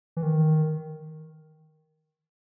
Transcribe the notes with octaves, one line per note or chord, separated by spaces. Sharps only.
E3
D#3